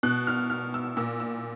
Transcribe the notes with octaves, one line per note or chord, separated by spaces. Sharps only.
B2 F#6
F6
F6
E6
A#2 E6
E6